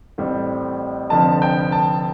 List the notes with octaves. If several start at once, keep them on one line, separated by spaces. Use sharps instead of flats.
A1 A2 G3 C4
F1 F2 D3 F3 C4 A5
G5
A5